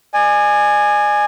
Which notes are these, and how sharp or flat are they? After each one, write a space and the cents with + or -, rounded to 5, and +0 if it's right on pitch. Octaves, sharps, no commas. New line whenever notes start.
D5 +40 G#5 +0